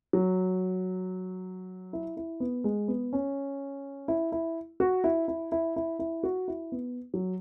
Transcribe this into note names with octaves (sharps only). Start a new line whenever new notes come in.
F#3
E4
E4
B3
G#3
B3
C#4
E4
E4
F#4
E4
E4
E4
E4
E4
F#4
E4
B3
F#3